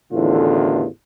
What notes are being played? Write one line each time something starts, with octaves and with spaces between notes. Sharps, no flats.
A1 E2 A2 D3 D#3 F4